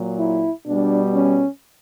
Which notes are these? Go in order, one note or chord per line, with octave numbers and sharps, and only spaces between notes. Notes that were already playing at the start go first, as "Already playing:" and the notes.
Already playing: A#2 F#3
E4
B2 G3 D4
C#4